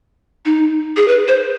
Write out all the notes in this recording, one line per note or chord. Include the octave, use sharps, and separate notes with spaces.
D#4
G#4
B4
C5